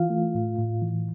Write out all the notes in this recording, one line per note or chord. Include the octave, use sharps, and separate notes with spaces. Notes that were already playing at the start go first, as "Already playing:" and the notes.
Already playing: E3 F4 F5
A3
A2
A2
E3